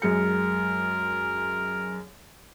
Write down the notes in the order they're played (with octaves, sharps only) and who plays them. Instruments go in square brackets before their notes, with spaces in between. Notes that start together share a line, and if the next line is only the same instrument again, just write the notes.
[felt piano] F#2 G#3 C#7 [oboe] A#4